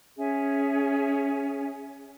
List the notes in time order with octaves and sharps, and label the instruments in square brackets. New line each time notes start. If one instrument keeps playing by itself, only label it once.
[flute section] C#4 G#4 E5 G#5